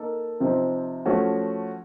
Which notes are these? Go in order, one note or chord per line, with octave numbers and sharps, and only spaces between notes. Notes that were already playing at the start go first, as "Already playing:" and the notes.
Already playing: A#3 D#4 A4
C3 F3 C4 D#4
F3 A3 C#4 F#4